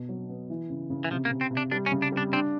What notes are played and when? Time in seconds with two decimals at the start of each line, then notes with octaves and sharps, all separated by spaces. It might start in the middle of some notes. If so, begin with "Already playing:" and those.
Already playing: B2
0.09 F#3
0.29 B3
0.50 E3
0.70 C#3
0.90 C#3
1.04 E3
1.11 C3 F3
1.25 A#3
1.31 C3
1.41 C4
1.51 C3
1.57 D4
1.71 G3 D4
1.86 C#4
1.92 C#3
2.02 D4
2.12 G3
2.17 D4
2.32 C4 D4